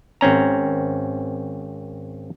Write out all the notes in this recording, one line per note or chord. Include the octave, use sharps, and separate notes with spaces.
G#1 C4 C#4 A#5